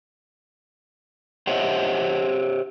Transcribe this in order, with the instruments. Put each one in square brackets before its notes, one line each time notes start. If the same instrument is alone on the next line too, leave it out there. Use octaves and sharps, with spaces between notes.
[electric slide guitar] G4 C5 C#5 D#5 E5 F#5